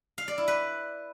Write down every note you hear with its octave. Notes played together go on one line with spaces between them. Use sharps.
F5
D5
E4
B4